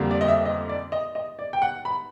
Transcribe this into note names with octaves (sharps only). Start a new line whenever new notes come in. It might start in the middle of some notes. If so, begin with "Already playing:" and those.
Already playing: F2 D3 G3 A#3
D5
D#5
E5
D#5
D5
D#5
D#5
D5
G5
F#5
B5